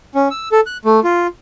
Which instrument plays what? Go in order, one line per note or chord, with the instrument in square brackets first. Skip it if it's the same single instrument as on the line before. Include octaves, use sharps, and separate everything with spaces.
[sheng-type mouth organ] C#4
E6
A4
F#6
A3
F4